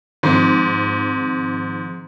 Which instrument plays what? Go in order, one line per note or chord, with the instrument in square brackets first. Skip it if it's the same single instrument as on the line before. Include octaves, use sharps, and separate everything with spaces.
[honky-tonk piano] G#2 [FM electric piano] D#3 F3 C4